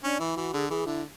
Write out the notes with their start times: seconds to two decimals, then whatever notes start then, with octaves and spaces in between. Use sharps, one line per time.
0.03 C#4 D4
0.20 E3 E4
0.37 E3 F#4
0.53 D3 G#4
0.70 E3 G#4
0.86 D3 E4